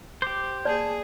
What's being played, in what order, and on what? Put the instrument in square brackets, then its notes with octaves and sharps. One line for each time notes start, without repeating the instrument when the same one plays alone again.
[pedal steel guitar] G4 C5 [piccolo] D6
[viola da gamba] A#3 G#4 [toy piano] D5 [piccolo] A5